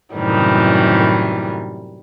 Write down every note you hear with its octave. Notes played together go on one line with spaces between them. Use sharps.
F#2 A2 C3 D#3 E3 G3